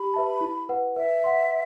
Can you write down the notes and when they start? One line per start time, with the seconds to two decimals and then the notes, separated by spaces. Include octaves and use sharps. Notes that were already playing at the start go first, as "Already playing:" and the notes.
Already playing: G4 B5
0.14 B4 E5 A5
0.41 E4
0.69 B4 F#5
0.96 B4 E5
1.24 F#5 C6